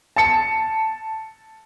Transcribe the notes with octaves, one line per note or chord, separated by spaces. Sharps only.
A5 C#7